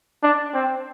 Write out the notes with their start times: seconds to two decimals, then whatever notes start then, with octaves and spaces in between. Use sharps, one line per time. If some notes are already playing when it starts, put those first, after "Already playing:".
0.23 D4
0.54 C4